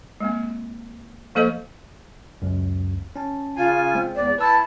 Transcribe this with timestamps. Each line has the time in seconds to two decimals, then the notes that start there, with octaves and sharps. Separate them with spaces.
0.20 G#3 A#3 C4
1.35 F3 A#3 A4 C5 D#5
2.42 C#2 F#2
3.16 C#4 A5
3.56 C#3 F4 G#5
3.95 G#3 C4
4.15 E2 D5
4.38 E4 B4 A5 E6